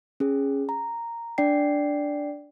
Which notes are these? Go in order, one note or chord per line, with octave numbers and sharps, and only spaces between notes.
C#4 G#4
A#5
D4 D5 G5 C7